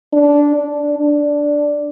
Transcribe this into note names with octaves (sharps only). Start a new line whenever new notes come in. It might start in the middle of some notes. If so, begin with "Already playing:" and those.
D4
D4
D4